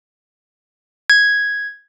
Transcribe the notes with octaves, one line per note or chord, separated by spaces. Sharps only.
G#6